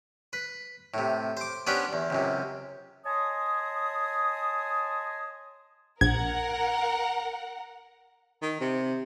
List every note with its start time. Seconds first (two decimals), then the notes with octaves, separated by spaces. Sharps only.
0.33 B4
0.94 A2 C3
1.37 C5 D6
1.67 B3 C#4 D4 G4 B4 C5
1.93 E2
2.10 C#2 F#2 C3
3.05 C#5 D#5 G#5 A5 C6 D#6
6.01 A#1 A#4 F#5 G#6
8.42 D#3
8.60 C3